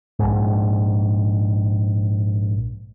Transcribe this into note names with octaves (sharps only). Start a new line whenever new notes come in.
A#1 G#2